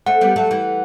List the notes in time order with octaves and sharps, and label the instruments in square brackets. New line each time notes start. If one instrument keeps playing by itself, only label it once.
[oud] A3 C4 [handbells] F#5
[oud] G3 B3
F#3 A3
E3 G3